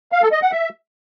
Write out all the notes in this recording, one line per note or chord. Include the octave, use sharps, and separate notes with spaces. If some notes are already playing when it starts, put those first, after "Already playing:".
F5
A4
D#5
F#5
E5